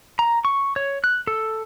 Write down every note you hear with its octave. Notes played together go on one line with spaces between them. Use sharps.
A#5
C#6
C#5
F#6
A4